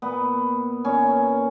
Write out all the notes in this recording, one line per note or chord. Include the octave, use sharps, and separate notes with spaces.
A#2 B3
A#2 C#4